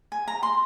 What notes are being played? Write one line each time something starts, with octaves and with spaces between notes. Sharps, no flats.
G#5
A#5
C6